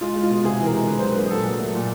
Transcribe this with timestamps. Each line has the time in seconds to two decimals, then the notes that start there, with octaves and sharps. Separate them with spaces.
0.01 G#3 F4
0.16 G#3
0.23 F4
0.30 B2
0.44 C3 G#4
0.60 E3
0.66 A#4
0.73 G#3
0.87 D3 B4
0.99 F#3 C5
1.10 B4
1.17 A#3
1.26 G#4
1.31 A#2 A4
1.46 F#3
1.60 A3
1.75 A#2